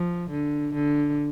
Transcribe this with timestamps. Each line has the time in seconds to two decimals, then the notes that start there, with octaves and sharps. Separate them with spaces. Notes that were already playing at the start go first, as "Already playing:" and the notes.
Already playing: F3
0.30 D3
0.74 D3